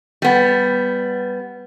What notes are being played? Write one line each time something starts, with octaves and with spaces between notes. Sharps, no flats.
G3 B3